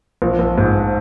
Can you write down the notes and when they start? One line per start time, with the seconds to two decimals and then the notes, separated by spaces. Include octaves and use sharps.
0.22 A#1
0.39 A#1
0.58 G#2